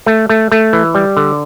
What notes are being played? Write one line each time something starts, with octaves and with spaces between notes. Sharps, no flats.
A3
A3
A3
E3
G3
D3